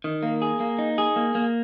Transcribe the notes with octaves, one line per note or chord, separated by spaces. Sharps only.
D#3
A#3
G#4
A#3
D#4
G#4
A#3
A#3